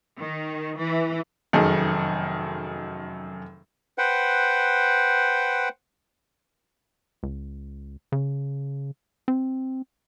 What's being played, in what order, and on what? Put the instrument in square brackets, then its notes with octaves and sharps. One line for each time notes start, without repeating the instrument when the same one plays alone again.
[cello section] D#3
E3
[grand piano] F1 F#2 D#3 G#4 A4
[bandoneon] B4 C5 F#5 G5
[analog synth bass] C#2
C#3
C4